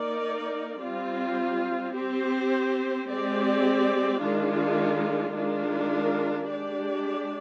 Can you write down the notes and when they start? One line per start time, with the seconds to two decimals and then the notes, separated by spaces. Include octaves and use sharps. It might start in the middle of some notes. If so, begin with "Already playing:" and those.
Already playing: A#3 D#4 A#4 D5
0.82 G3 C4 F4
1.95 C4 G4 C5
3.08 G#3 C4 G4 D5
4.21 D#3 G#3 D4 F4
5.34 D#3 G#3 D4 F4 A#4
6.47 G#3 D4 G4 D5